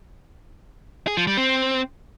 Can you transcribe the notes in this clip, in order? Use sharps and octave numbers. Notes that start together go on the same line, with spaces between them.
G#4
F3
G3
C4